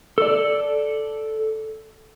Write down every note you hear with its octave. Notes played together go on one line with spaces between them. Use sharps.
A4 D5